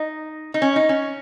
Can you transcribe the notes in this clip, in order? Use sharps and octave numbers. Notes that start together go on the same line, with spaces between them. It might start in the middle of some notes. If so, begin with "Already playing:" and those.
Already playing: D#4
D#4
C#4
D#4
C#4